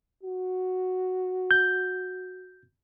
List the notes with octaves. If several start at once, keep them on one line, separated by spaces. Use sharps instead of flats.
F#4
G6